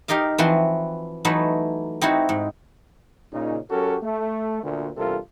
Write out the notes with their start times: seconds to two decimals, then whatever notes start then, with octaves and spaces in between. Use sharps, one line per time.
0.08 D#4 G4 A#4 D#5 F5
0.38 E3 F3 C4 F#4 B4 C6
1.25 E3 F#3 A3 D#4 E4 B4
2.01 C4 D#4 E4 F#4
2.29 G#2
3.33 A#2 C#3 D#4
3.70 F#3 C#4 F#4 G4 A4 A#4
4.03 A3
4.63 D2 A#2
4.97 E2 G2 C3 F4 A4 A#4